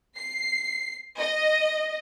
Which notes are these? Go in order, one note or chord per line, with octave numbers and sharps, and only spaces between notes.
C7
D#5